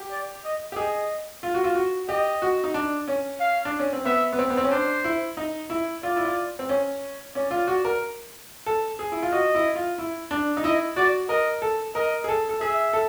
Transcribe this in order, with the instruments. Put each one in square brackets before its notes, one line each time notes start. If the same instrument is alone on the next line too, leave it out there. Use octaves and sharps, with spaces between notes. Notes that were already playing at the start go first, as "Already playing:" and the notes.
Already playing: [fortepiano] G4
[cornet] D5
D#5
[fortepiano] G4
[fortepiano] G#4 [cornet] D#5
[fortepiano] F4
F#4
F4
F#4
[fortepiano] G4 [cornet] D#5
[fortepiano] F#4
D#4
D4
C#4
[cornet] F5
[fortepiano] D4
C#4
C4
[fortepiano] B3 [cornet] E5
[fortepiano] B3
C4
B3
C4
C#4
[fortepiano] D4 [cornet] C5
[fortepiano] E4
D#4
E4
[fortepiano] F4 [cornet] D5
[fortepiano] E4
F4
C4
C#4
[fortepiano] C#4 [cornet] D5
[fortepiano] F4
F#4
A#4
A4
G#4
E4
F4
[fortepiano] F#4 [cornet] D#5
[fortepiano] E4
F4
E4
D4
D#4
[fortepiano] E4 [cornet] D#5
[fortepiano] F#4 [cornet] D5
[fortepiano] A#4 [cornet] D#5
[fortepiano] A4
[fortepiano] A#4 [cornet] D#5
[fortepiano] G#4
A4
A4
[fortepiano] G#4 [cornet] E5
[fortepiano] A4